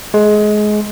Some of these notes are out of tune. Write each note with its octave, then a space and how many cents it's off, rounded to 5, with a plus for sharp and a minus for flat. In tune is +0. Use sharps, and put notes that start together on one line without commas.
G#3 +20